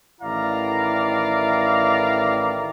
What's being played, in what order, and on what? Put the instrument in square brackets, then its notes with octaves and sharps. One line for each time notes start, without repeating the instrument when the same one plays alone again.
[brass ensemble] A1 D#3 E4 D5 F5 A#5